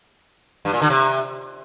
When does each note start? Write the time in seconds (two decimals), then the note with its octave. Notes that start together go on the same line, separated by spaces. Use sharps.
0.65 G2
0.73 A#2
0.82 D3
0.90 C3